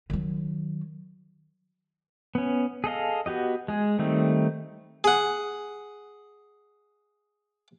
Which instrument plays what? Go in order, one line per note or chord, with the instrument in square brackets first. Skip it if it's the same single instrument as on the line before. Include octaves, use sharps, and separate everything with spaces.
[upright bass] D#3 F#3
[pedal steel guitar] B3 C#4
G#4 A4 D#5 F5
B3 F#4 G4 D#5
G#3 G#4
D#3 G3 A3 C4 D#4
[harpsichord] G#4 F#5